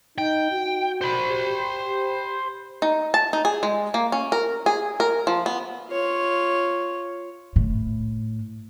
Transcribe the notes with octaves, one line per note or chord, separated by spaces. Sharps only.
D#4 G5
F#4
C5 B5
G4
D#4
A5
D#4
G#4
G#3
A#3
C#4
A#4
G#4
A#4
F3
B3
F4 C#5
A2